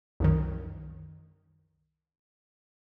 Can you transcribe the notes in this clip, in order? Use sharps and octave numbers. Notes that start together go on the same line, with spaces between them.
C2 F#2 D#3